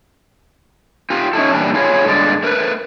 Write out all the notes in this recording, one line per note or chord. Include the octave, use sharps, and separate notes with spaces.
F4 G4
C#4 D#4 E4 A4
A#2 E3 G3 D4 A5
E4 F4 G#4 C#5
G2 D3 G#3 D5
A3 A#4 B4